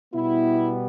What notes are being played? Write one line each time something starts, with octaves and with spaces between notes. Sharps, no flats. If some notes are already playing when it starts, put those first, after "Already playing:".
B2 G3 B3 E4